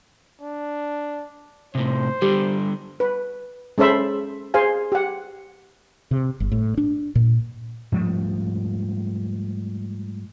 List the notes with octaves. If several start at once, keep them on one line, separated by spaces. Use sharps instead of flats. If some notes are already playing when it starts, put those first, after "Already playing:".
D4
A2 C3 C5
D3 G3 G4
B4
G#3 C#4 A4 C5 E5 B5
G#4 C5 F5 G#5
G4 F#5
C3
G1
A2
D4
A#2
G#2 F3 G3 A3